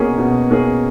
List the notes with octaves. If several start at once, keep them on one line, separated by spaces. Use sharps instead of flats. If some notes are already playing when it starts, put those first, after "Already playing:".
Already playing: B2 A#3 C#4 G#4
B2
A#3 C#4 G#4